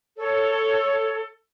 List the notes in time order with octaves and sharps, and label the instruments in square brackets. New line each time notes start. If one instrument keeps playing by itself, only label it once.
[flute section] A4 C#5